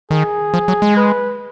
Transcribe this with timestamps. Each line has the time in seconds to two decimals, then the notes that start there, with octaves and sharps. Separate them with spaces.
0.11 D#3 G#4
0.54 F3
0.68 F#3
0.82 G#3
0.97 B4